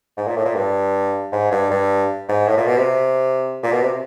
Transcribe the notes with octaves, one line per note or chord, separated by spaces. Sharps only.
G#2
A#2
A2
A#2
G2
G#2
G2
G2
G#2
A2
A#2
B2
C3
A#2
B2
C3